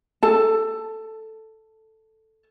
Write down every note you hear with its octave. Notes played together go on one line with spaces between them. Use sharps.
A4 A5